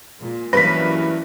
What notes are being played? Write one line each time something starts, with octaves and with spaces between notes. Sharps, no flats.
A#2 G#3
G2 E3 F#3 A#3 C#4 B4 A#6 B6